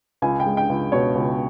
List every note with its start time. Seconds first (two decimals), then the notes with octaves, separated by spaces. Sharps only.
0.22 C#2 G#5
0.40 G5
0.46 G#3
0.57 G5
0.69 C#2
0.92 B2 C#5
1.15 C#2